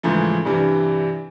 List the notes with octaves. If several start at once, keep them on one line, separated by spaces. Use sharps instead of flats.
G#2 C#3 E3 F3 A3
G2 C3 E3 G3